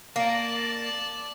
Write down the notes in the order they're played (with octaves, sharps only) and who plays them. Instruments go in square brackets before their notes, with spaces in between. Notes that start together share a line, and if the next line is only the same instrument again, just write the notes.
[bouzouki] A#3 [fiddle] D5 A5